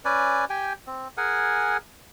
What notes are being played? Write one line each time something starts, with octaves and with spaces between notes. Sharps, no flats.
C#4 B4 D5 G#5
G4 G5 G#5
C4
G#4 A#4 F#5 G#5